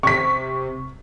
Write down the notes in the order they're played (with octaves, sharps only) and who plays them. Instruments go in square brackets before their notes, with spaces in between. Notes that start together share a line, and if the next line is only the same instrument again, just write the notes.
[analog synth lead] C3 [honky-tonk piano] C#6 B6